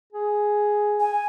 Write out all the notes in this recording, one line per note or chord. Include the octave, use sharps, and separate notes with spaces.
G#4
G#5